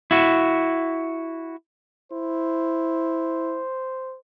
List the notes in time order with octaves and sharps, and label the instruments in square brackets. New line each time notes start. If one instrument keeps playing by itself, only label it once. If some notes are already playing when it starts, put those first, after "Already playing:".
[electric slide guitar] E4 F#4
[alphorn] E4 [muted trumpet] C5